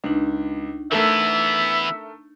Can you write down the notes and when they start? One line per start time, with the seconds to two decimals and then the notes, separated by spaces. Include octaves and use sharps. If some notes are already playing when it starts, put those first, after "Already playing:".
0.04 C#2 D4 D#4
0.92 E3 A3 B3 A4 A#4 E5